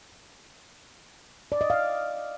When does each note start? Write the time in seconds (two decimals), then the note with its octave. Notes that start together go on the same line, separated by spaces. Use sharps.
1.52 D5
1.61 D#5
1.70 F5